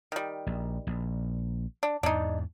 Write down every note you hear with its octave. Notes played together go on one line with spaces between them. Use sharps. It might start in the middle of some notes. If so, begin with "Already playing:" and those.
D#3 G3
A#1
A#1
D4
E2 G#2 D4 D#4